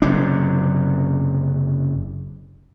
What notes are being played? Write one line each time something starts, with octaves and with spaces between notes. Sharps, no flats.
F#1 F#2 C3 D4